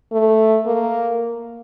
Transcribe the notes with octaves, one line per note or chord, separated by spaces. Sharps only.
A3
A#3